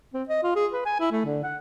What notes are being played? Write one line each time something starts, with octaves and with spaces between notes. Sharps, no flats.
C4
D#5
F4
G#4
B4
G#5
E4
A3
D3
F#5